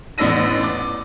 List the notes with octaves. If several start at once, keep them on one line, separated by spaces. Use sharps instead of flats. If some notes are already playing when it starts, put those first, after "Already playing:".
A1 B3 D4 E6 A#6 D#7
D6